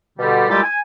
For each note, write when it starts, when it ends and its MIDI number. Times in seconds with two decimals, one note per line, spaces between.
0.18 0.45 47
0.18 0.45 50
0.18 0.45 55
0.49 0.62 46
0.49 0.62 55
0.49 0.62 56
0.49 0.62 64
0.49 0.62 67
0.49 0.62 69
0.63 0.79 80